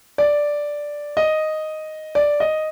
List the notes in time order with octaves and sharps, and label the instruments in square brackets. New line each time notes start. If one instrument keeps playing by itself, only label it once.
[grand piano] D5
D#5
D5
D#5